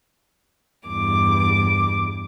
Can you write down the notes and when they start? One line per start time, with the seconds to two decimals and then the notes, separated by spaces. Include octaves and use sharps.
0.87 E2 G2 D6